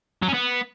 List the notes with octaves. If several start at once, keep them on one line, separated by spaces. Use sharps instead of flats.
F#3
C#4
B3